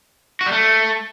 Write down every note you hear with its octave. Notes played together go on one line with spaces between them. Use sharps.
F#4
G3
A3